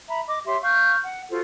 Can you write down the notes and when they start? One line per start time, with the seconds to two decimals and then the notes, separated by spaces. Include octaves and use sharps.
0.08 E5 A#5 B5
0.27 D#5 D6
0.46 G4 C#5 E5 C6
0.62 F5 C#6 F6 G6
1.02 F#5
1.30 F4 F#4 A4 C5